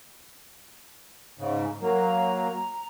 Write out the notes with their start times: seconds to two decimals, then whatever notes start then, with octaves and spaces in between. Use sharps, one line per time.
1.39 G#2 C#3
1.81 F#3 A#3 A#5